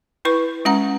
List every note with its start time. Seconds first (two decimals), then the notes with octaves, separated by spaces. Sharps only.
0.25 E4 B4 C#6
0.65 G#3 C#4 F#5 A#5